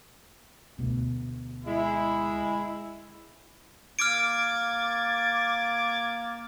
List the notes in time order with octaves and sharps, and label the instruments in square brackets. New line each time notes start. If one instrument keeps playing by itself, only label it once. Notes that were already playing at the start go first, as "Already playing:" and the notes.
[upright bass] D2 B2
[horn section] G#3 E4
[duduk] A#3 [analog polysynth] D6 G#6 A6 [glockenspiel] F6 D7